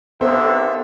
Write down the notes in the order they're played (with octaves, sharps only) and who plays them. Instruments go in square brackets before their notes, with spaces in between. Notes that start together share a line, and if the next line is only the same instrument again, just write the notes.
[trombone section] D#2 G#2 D3 [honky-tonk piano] B3 A4 C5 [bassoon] C4 [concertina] E5